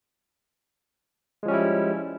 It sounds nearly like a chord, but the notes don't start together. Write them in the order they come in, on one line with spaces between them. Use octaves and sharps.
G#3 F3 C#4 G3 E4